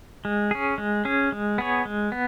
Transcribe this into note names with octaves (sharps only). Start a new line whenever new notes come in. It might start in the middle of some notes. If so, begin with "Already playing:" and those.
G#3
C#4 G#4
G#3
C#4 G#4
G#3
B3 G#4 C#5
G#3
B3